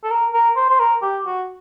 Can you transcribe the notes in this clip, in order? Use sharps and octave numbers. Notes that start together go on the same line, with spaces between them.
A4
A#4
A#4
C5
C5
A#4
G4
F#4